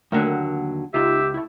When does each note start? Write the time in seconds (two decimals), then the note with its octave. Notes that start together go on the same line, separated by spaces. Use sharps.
0.12 D#2 D3 F#3 A3 A#3 A#4
0.94 C#2 D#4 F4 G4 E5
1.34 A3 E4